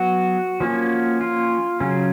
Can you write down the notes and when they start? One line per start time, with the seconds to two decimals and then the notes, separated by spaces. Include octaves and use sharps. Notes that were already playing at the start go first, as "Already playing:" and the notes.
Already playing: F#3 B3 F#4
0.60 F3 A#3 C#4
1.21 F4
1.80 C#3 F#3 C#4